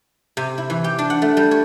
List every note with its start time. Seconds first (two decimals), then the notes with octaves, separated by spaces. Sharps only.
0.37 C3
0.58 E4
0.70 E3
0.84 G4
0.99 D4
1.10 F#5
1.22 A3
1.37 G3
1.51 C#5